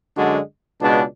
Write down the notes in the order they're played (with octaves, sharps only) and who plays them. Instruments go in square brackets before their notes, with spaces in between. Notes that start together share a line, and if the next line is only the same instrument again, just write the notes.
[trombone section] F#2 D3 G#3 D4 F#4
C#2 B2 G#3 D4